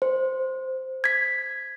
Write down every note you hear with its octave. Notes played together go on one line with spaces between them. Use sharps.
C5
G#6 B6